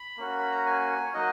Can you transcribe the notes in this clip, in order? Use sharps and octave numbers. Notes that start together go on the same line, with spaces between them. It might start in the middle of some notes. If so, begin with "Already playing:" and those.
Already playing: B5
A#3 C#4 F#4
B5
A#5
G#5
C#5
F#3 A#3 D#4 F#4 D#5